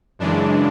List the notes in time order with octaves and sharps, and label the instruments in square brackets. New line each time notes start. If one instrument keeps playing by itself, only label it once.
[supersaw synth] F#2 C#3 E3 G#3 D4